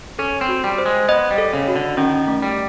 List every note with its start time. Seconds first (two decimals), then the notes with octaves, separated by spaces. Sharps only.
0.19 C#4 A4
0.41 C4
0.49 F#4
0.64 G3
0.78 C5
0.86 G#3
1.08 B3 D#5
1.31 G3
1.38 A4
1.53 C#3
1.68 F#4
1.75 D3
1.97 D#3 C#4
2.28 A3
2.42 G3